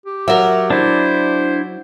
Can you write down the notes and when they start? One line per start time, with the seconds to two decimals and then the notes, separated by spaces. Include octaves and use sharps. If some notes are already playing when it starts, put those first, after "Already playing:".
0.06 G4
0.28 F#3 A#4 E5
0.70 D4 E4 C5